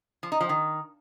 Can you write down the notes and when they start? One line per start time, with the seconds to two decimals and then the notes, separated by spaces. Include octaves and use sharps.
0.23 F3
0.32 D#4
0.41 F3
0.49 D#3